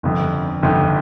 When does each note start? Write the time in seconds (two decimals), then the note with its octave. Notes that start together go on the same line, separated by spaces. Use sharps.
0.03 G1 F2 D3
0.63 G1 F2 D3